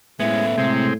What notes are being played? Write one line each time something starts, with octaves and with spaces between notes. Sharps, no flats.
A2 G#3 B3 C#4 E5
C3 G#3 C4